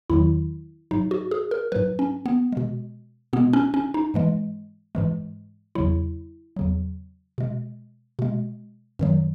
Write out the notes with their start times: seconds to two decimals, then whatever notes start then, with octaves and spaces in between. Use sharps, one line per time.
0.10 E2 D#3 F#3 E4
0.91 G#2 F#3 D#4
1.11 F#4
1.31 G#4
1.51 A#4
1.72 G#2 F#3 B4
1.99 C#4
2.26 B3
2.52 B2 G#3
3.33 B2 G#3 B3
3.53 C#4
3.74 C#4
3.94 D#4
4.14 G#2 E3 G#3
4.95 G#2 E3 G#3
5.75 E2 C#3 F#3 E4
6.56 E2 C#3 F#3
7.38 B2 G#3
8.19 B2 G#3
8.99 F#2 D#3 F#3